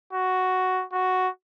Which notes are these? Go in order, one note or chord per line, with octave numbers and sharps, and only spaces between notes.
F#4
F#4